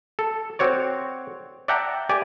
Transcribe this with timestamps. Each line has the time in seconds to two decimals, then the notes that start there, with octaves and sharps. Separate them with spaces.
0.19 A4
0.59 C4 F#4 C#5 D5
1.68 D5 E5 F#5 G5 A5 A#5
2.09 G4 D5 G#5